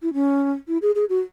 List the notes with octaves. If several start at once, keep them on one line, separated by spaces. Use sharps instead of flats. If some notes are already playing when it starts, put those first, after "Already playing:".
E4
C#4
E4
G#4
G#4
F#4